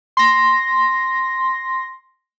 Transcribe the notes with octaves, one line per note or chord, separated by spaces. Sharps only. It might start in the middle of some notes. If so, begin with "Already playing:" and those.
C6 A#6